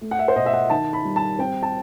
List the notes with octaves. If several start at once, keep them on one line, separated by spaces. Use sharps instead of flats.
A3
F#5
E5
C5
B2 D#5
E5
F#5
D#3 A5
B5
G3
A5
C4 G5
A5